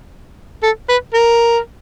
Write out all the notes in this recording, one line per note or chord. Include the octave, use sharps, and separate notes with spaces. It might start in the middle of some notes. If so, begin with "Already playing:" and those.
A4
B4
A#4